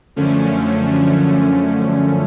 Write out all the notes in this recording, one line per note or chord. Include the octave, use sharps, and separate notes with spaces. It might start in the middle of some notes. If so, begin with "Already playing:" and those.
F#2 D3 F3 A3 C#4